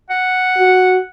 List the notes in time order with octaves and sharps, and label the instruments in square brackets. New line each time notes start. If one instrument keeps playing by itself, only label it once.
[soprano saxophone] F#5
[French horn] F#4